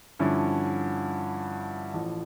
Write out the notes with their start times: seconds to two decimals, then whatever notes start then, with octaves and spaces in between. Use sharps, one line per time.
0.19 G2 D3 F3 C#4 E4
1.93 A1 A2 F3